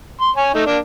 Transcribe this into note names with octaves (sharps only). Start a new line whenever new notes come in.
C6
C#5 G#5
A3 D#4
A#3 D4